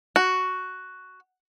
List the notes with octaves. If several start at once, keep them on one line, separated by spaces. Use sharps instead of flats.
F#4